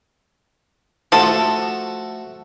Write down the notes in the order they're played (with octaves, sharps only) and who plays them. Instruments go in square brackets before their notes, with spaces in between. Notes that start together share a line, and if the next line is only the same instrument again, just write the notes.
[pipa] F3 A4 [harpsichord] A3 F#4 F#5